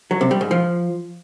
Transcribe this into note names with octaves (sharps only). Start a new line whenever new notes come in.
F#3
C3
G3
G#2
F3